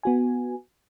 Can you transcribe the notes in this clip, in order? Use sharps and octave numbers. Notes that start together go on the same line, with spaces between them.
B3 F#4 G#5